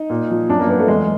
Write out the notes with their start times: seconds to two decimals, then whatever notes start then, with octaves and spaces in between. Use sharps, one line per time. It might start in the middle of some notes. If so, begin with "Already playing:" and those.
Already playing: D#4
0.10 A#2
0.30 F3
0.49 F#2 D4
0.60 A#3
0.68 F#2 B3
0.79 A3
0.88 E2 G#3